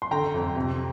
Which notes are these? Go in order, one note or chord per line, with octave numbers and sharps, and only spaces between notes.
C6
D3 G5 A#5
F2
C3